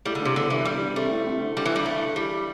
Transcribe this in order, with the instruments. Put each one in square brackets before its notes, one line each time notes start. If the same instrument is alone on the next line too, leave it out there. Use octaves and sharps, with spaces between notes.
[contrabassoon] A2 [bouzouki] G3
[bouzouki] D3
[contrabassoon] G2 [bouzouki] C3
[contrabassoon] E2 [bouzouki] D3
[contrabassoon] G2 [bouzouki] E3
[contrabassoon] E2 [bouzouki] G3
[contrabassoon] G2
[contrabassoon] C3 [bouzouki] A3
[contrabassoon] A2
C3
D3
[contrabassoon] D3 [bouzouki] G3
[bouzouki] E3
G3
A3
[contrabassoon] E3 [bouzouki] G3